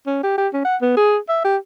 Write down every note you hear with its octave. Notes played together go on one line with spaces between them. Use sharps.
C#4
G4
G4
C#4
F#5
B3
G#4
E5
G4